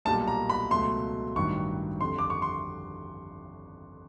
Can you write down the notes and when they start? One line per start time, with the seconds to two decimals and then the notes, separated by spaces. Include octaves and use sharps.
0.05 B1 A#2 G3 A5
0.28 A#5
0.50 B5
0.71 C#2 B2 F#3 A3 C6
1.35 A1 G2 D#3 F#3 C#6
2.00 F2 D3 G3 C6
2.18 D6
2.30 C#6
2.42 C6